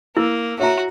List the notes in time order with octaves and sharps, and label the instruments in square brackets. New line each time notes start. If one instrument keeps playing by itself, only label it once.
[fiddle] A#3 [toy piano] E4 [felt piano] E6
[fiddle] F#4 [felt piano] C#5 E5 A#5